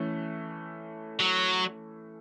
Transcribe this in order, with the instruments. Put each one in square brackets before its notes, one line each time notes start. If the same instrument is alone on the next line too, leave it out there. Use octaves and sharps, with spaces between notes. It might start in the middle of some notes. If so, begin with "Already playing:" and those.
Already playing: [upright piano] E3 A3 C#4
[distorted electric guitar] F#3